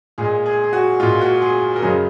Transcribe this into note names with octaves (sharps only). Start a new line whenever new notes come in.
A#2 G#3 G#4
G#4
G#4
F#4
A#2 G#3 F4
F#4
G#4
A#4
F#2 C#3 G#3 G#4